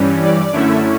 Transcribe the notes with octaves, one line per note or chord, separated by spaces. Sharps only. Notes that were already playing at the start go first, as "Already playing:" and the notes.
Already playing: G2 E3 G3 C#4
D5
F#2 D3 A3 C#4 E4 E5